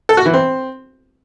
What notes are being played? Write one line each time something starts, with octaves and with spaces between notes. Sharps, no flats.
A4
F#4
E3
C4